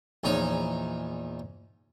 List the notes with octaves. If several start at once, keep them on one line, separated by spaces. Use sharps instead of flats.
A#1 E2 D#4 C#5